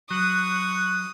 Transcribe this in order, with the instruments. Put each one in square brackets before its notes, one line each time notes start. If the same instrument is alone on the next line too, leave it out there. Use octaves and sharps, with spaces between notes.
[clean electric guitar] F#3 [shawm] C#6 [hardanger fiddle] D#6 [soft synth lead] F#6